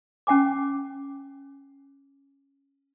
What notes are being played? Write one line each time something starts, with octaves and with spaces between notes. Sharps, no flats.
C#4 F#5 G#5 D6